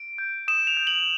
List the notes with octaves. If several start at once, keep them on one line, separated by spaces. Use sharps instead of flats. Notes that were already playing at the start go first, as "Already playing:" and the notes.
Already playing: D7
G6
D#6 E7
F7
G6
F#7